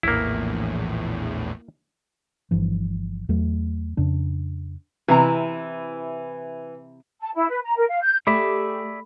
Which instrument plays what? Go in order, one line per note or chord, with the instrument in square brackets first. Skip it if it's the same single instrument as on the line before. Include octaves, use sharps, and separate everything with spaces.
[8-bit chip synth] A#1 E2 A2 [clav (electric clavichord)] A#3 E4
[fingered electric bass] G1 G2 E3 F3
E2 F#3 A3
F2 C#3 D4
[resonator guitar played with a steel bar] C3 E4 A#5 [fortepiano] E3
[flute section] A5
E4
B4
A#5
A#4
F5
G6
[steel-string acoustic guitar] A3 [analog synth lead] G4 [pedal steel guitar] G#4 D5 E5 [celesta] B5